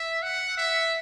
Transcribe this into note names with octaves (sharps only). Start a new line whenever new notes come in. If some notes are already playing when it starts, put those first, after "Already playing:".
Already playing: E5
F#5
E5